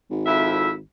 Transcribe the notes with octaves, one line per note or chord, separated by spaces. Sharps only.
G#1
F2 E4 E5